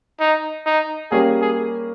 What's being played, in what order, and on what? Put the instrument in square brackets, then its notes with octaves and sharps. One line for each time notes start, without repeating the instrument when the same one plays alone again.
[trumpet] D#4
D#4
[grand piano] G3 A#3 C#4 G4 [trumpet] G#4
[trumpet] G#4